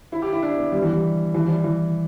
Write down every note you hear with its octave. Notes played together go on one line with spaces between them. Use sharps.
E4
G4
E4
D4
B3
G3
E3
G3
E3
G3
E3
E3